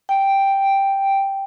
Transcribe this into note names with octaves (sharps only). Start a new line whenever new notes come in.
G5